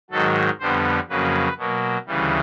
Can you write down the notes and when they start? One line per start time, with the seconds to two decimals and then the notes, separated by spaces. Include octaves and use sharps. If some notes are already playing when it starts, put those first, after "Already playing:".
0.10 G#2 D#3 F#3 A4
0.60 F2 D3 G3 B3 C5
1.09 F2 C#3 F#3 A#3 B4
1.58 B2 F#3 A#3
2.07 D2 C#3 E3 G3